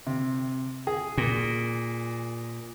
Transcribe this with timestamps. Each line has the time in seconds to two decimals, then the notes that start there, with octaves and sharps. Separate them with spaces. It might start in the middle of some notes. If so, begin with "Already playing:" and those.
0.07 C3
0.87 G#4
1.18 A#2